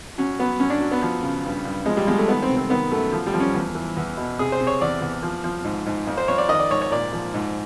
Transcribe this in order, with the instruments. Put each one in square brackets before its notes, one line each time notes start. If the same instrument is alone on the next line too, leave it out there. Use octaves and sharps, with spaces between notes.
[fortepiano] F#3 C#4
F#3 B3
F#2 C#4
D4
F#3
B3
F3
C#3
G2
G2
F3 G#3
G3
F3 G#3
A3
D#3 B3
C4
C3
C4
D#3 B3
F#2 A3
F3
G3
F3
C#4
E2
E3
E2
B2
C3 G#4
C5
C3
C#5
E2 D5
E2
F3
F3
G#2
G#2
F2
C5
F2 C#5
D5
D#3 D#5
D5
G#2 C#5
C#5
A#2 D5
F3
G#2